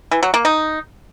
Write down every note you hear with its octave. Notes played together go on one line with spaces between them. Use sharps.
E3
F#3
A#3
D#4